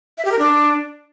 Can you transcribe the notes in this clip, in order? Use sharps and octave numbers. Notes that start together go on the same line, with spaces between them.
E5
G4
A#4
D4